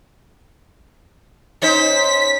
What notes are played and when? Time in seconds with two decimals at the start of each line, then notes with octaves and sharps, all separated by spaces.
1.62 C#4 D#4 C5 B6